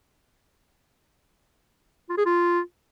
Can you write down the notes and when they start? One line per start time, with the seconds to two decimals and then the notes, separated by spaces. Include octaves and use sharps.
2.10 F4
2.17 G#4
2.25 F4